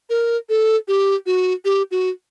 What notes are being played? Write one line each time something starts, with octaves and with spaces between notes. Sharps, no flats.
A#4
A4
G4
F#4
G4
F#4